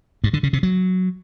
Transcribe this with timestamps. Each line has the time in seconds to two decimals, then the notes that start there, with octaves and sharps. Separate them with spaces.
0.24 G2
0.33 D3
0.43 C#3
0.53 C3
0.63 F#3